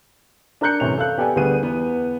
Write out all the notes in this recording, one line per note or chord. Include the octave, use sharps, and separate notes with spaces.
D4 A#4 A#5 F#6 G6 C#7
F#2 A2 C3 E3 C#5 F7
A4 F5 F#6
B3 G4 A4 D5 G#5
D2 G3 B3 G#4 D#7
E2 B3